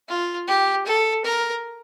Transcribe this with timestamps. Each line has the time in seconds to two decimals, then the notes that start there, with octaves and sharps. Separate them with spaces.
0.09 F4
0.48 G4
0.86 A4
1.25 A#4